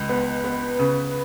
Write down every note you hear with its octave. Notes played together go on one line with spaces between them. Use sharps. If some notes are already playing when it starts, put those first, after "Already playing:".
Already playing: C#2 G#3
B3 B4
B3
C#3